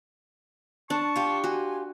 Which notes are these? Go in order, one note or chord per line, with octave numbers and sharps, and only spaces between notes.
D4 A5 C#6
F4 G4
F#4 G#5